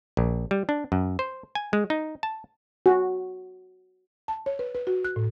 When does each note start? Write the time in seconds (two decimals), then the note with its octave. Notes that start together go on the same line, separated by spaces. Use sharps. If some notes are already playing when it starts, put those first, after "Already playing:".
0.17 A#1
0.51 G3
0.69 D4
0.92 F#2
1.19 C5
1.55 G#5
1.73 G#3
1.90 D#4
2.23 A5
2.86 F#4
4.28 A5
4.46 C#5
4.59 B4
4.75 B4
4.87 F#4
5.05 F#6
5.16 A2